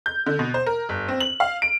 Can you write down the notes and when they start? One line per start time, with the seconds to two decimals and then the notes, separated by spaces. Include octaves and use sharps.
0.06 G6
0.26 D3
0.39 B2
0.54 C5
0.66 A#4
0.89 G1
1.08 C4
1.21 F#7
1.40 F5
1.62 D7